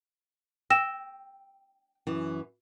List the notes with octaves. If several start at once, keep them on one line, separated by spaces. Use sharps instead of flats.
G5 E6 A#6 E7
F#2 E3